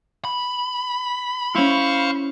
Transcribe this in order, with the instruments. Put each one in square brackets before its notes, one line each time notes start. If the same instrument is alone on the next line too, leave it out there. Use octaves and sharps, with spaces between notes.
[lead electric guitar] B5
[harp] C#4 E4 [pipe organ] C5 F5 C#6